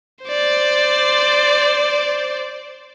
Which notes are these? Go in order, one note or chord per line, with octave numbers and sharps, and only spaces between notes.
C5 D5